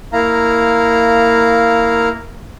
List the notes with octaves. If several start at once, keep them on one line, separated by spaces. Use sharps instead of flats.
A#3 E4 F5 A#5